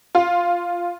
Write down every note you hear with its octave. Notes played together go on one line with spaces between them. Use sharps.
F4